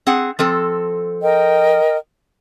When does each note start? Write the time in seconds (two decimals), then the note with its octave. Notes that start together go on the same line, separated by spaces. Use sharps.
0.07 C4 G#4 F#5
0.39 F3 C4 A4
1.22 A#4 D#5 G5